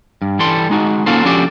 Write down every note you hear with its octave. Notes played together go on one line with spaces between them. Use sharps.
G2
E3 G3 A4 C6
G#3 D#4 F#4
A#3 C#4 F4 F#4 A4 C5
F3 C#4 D4 F#4 G4 A4